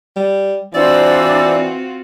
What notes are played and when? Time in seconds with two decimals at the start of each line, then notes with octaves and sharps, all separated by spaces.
0.16 G3
0.74 E3 C4 D4 F4 F#4 C5 D5 E6